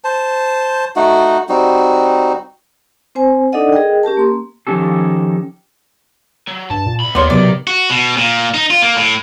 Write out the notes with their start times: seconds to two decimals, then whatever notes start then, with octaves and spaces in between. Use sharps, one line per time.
0.04 C5 A5
0.96 A3 D#4 F#4 F#5
1.49 G3 C4 D#4 F#4
3.15 C4 C5 G#5
3.52 D4 D#4 A4 D5 D#5 F#5
3.72 G#4 A#4 D#5 G5
4.03 C#4 G4 A#4 A5
4.17 A#3 C6
4.67 D#3 F3 C#4 G4 A4
6.47 F#3
6.70 G2 A5
6.86 A#2
7.00 C2 B5
7.15 D#2 B3 D#4 A#4 C#5 D5 C6
7.30 B1 C3 F#3 B3 D5
7.67 F#4
7.90 B2
8.17 A#2
8.54 D#4
8.70 F4
8.82 A#3
8.96 A2